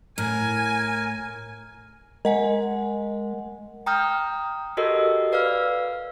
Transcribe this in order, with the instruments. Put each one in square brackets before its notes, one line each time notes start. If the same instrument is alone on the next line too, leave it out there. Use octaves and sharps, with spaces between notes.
[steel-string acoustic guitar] A2 [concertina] A#4 [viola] G#5
[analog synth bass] G#3 [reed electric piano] A#4 [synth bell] D#5 F#5 G#5
[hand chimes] G5 A#5 D#6 F6 G6
F#4 G4 A4 A#4 D#5 E6
B4 D5 F5 E6 F6